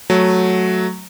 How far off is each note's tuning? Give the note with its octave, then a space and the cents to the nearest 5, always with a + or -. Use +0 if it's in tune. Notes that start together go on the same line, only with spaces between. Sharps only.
F#3 +0 A3 -5